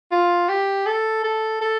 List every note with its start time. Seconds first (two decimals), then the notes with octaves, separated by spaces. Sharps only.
0.12 F4
0.49 G4
0.86 A4
1.24 A4
1.61 A4